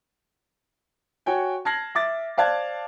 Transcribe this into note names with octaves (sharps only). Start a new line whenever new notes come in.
F#4 C#5 G5 G#5
A5 F6 G#6 A#6 C7 F#7
E5 D6 A6
C5 D5 F5 A5 F#6 G#6